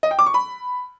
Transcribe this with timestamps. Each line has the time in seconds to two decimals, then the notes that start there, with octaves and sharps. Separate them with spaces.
0.03 D#5
0.11 G5
0.19 D6
0.26 C#6
0.34 B5